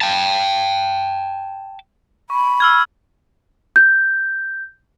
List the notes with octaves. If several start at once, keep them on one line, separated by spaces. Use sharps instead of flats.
G5 A5
B5 C#6
E6 F6 G#6
G6